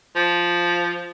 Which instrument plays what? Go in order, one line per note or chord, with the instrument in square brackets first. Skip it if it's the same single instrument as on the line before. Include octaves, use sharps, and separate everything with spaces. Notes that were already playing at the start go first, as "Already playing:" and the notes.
[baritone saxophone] F3